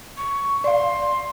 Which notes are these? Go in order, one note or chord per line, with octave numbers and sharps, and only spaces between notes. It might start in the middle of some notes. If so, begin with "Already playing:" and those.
C#6
D5 F5 C6